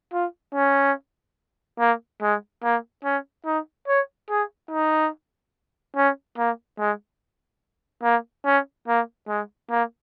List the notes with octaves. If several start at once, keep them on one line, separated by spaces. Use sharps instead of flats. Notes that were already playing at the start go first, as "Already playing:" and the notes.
F4
C#4
A#3
G#3
A#3
C#4
D#4
C#5
G#4
D#4
C#4
A#3
G#3
A#3
C#4
A#3
G#3
A#3